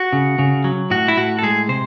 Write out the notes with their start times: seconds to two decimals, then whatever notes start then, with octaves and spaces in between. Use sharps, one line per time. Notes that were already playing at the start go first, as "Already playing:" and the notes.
Already playing: F#4
0.13 C#3
0.39 C#3
0.64 F#3
0.90 A2 F#4
1.08 E4
1.17 A2 F#4
1.39 A4
1.43 G#3 G#4
1.69 C3 C5